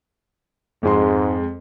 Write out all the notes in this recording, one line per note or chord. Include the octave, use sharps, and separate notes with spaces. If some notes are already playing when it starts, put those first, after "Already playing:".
F2 G#2 G#3 C6